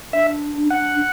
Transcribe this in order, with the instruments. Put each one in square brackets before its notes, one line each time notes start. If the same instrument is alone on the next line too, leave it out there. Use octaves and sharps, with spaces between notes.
[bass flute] D4 [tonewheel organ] E5
[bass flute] D4 [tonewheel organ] F#5